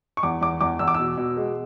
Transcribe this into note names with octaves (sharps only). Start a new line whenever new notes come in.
C#6
E2 D6
E2 D6
E2 D6
E2 E6
D6
E6
B2
B2
G#3